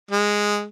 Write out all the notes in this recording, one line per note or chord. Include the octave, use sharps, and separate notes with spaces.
G#3